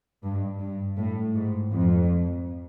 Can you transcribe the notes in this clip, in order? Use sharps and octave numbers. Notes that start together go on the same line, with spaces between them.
G2
G2
A2
G#2
F2